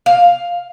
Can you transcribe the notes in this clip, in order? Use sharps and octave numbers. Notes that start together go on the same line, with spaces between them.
F5